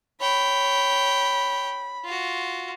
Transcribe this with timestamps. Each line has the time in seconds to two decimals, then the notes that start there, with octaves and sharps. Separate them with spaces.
0.21 C#5 G5 B5
2.04 F4 F#4